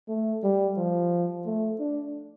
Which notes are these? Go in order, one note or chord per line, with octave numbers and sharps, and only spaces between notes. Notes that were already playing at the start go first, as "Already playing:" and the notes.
A3
G3
F3
A3
D4